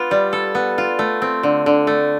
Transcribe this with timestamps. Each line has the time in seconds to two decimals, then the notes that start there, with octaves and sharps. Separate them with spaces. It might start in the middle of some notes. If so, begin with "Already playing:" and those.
Already playing: B3 F4
0.11 G3
0.33 A4
0.55 B3
0.78 F4
0.99 A3
1.22 C4
1.43 D3
1.66 D3
1.87 A3